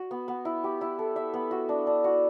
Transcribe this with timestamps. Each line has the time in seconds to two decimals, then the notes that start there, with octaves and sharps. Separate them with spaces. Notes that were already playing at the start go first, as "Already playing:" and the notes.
Already playing: F#4
0.11 B3
0.28 B3
0.45 E4
0.64 G4
0.81 E4
0.99 A4
1.16 E5
1.34 B3
1.51 F#4
1.69 D4
1.87 D4
2.04 F#4